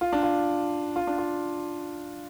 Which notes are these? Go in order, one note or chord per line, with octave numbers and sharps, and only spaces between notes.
F4
D4
F4
F4
D4
F4